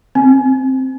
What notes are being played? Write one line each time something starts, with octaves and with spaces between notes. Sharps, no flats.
C4